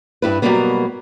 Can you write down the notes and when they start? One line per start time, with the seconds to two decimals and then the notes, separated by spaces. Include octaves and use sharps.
0.22 G2 E4 B4
0.42 B2 E3 F#3 G3 A#3 B3